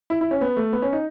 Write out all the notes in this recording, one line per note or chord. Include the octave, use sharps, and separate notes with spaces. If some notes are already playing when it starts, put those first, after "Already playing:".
E4
E4
C#4
B3
A3
B3
C#4
D#4